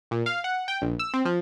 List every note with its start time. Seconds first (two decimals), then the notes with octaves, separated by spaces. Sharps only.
0.11 A#2
0.26 F5
0.44 F#5
0.68 G5
0.82 A#1
0.99 E6
1.14 C4
1.25 F3